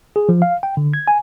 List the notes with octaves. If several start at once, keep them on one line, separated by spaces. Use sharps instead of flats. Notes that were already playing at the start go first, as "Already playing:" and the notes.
G#4
F3
F5
G5
D3
G#6
G#5